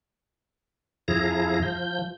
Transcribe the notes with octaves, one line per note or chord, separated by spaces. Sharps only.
F2 F3 E4 G#4 A#5 A#6
F3 G6